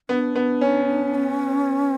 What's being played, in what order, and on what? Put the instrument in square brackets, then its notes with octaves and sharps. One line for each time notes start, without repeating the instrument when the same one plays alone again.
[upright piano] B3 [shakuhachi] D4
[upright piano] B3
C#4
[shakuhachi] C#4